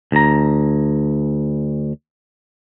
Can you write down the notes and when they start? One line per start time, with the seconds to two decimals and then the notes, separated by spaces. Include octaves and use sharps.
0.12 D2 A#5